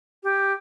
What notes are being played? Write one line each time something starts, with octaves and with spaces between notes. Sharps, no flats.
G4